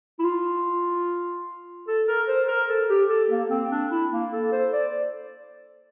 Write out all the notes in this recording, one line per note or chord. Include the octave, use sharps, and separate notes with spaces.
E4
F4
A4
A#4
C5
A#4
A4
G4
A4
A#3
C4
D4
E4
A#3
A4
C5
D5